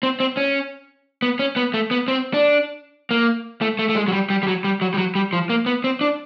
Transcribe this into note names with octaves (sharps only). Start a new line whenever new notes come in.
C4
C4
C#4
B3
C#4
B3
A3
B3
C4
D4
A#3
A3
A3
A3
G#3
F#3
G3
G3
G3
F#3
G3
F#3
G3
F#3
G3
F3
A#3
B3
C4
D4